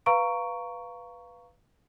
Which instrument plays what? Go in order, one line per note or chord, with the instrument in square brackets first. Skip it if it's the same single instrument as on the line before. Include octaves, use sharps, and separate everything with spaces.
[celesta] B4 F5 A#5 C#6 D7